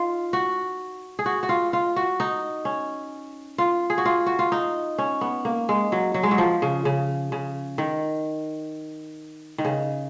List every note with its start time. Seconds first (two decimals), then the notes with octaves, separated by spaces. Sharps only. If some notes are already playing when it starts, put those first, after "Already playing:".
Already playing: D#4 F4
0.33 F#4
1.19 G#4
1.26 F#4
1.43 F#4
1.49 F4
1.73 F4
1.96 F#4
2.20 D#4
2.65 C#4
3.58 F4
3.90 G#4
3.98 F#4
4.05 F4
4.26 F#4
4.39 F4
4.52 D#4
4.98 C#4
5.21 B3
5.45 A#3
5.69 G#3
5.92 F#3
6.14 F#3
6.23 G#3
6.31 F#3
6.38 F3
6.62 C#3
6.85 C#3
7.32 C#3
7.78 D#3
9.58 D#3
9.65 C#3